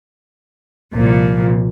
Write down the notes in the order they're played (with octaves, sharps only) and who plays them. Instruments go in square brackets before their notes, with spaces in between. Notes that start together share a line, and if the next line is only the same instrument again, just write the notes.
[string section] C2 A#2 F3